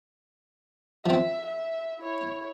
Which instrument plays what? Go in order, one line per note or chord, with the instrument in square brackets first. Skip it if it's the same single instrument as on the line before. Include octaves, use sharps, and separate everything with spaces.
[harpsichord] F3 C4 [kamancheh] E5
[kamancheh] E5
E4 C#5